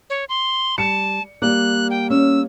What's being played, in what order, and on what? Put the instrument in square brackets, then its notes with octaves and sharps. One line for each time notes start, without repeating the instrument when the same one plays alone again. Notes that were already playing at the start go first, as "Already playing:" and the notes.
[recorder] C#5
C6
[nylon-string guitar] G3 [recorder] A5 [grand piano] C#7
[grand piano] G3 A#3 [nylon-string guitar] D5 [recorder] F#6
[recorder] G5
[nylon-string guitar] C#4 [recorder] E6